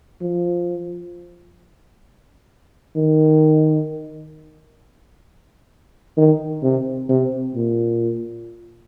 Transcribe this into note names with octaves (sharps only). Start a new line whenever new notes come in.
F3
D#3
D#3
C3
C3
A#2